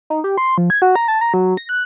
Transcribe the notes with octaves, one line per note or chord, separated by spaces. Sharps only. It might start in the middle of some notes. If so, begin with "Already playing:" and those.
D#4
G4
C6
F3
G#6
F#4
A#5
A5
A#5
F#3
A#6
F#6